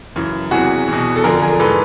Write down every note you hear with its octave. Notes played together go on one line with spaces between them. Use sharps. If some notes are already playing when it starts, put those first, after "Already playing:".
F#2 C#3 E3
E2 C3 E3 F#4 G#4
E2 B2
A4
F2 D3 F3 G#4 A#4
G#4 A#4
G#2 E3 A4 B4